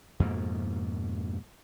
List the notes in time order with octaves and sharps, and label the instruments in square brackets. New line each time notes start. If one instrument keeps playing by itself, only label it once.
[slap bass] F2 G#2 B2 A#3